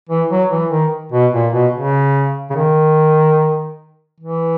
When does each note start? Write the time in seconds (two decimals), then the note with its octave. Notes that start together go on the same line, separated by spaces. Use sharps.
0.09 E3
0.30 F#3
0.51 E3
0.71 D#3
1.12 B2
1.34 A#2
1.53 B2
1.74 C#3
2.50 C#3
2.56 D#3
4.21 E3